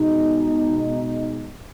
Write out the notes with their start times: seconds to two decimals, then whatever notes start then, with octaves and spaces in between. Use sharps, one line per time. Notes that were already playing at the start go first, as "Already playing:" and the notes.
Already playing: B2 G#3 D#4